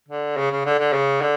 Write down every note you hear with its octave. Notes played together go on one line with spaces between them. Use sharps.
D3
C#3
C#3
D3
D3
C#3
D3